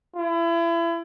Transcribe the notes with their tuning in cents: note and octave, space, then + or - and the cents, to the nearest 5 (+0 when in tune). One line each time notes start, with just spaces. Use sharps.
E4 +35